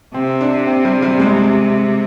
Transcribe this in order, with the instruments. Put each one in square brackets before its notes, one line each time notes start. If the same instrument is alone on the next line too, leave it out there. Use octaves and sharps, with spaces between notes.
[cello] C3 [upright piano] C4
[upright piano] D4
C4
G3
G3
G#3